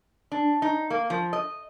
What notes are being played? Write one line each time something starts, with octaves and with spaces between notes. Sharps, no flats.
D4
D#4
A#3
F3
D#5